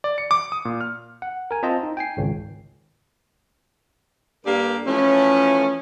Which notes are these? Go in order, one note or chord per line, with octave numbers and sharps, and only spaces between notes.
D5
C#7
D6
D#6
A#2
F6
F#5
A#4 G#5
C4 F4 C5 D#5 A5
D#4
G5 G#5 C7
G#1 C#2
G2 A#3 G4 A4 A#4 D5
E3 F3 A3 C#4